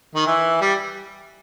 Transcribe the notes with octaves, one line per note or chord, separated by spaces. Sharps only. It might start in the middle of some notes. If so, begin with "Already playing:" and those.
D#3
E3
G3